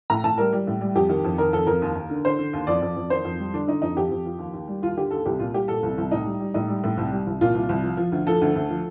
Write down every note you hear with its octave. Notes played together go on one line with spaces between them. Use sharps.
A2 A#5
A2 A5
G3 A#4
G3
A2
G3
F2 G4
D#3
F2
D#3 A#4
F2 A4
F2 A#4
D#2
D#2
D3
D3 C5
D3
D#2
F2 D5
F2
F2
D#3 C5
F2
G3
D3 D4
D3 D#4
F2 D#4
F2 G4
F2
F3
D#2
D#2
G3
D#2 F4
D3 G4
D#2 A4
C2 G4
A#2 F4
G3 G4
A#2 A4
C2
C2
A2 D#4
G3
G3
A2 D#4
G3
A2
C2
G3
C2
A#2 F4
C2
C2
F3
F3
D2
F3 A4
D2
D2
F3